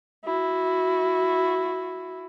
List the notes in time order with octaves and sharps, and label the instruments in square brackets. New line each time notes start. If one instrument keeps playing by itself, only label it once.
[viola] E4 F#4